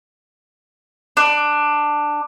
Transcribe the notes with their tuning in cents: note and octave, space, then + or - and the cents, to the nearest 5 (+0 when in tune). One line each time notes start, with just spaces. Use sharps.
D4 +10